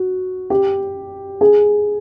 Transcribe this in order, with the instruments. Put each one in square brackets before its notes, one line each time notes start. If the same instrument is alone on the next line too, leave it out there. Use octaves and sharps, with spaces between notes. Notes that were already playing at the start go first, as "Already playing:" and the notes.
Already playing: [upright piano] F#4
G4
G#4